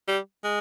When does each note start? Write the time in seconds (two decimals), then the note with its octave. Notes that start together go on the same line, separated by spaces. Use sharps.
0.08 G3
0.44 G#3